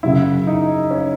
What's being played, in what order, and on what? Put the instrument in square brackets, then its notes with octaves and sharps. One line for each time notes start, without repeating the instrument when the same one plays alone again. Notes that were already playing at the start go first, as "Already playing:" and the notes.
[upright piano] F#2 C#3 F#3 [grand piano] E4
[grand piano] D#4
C#4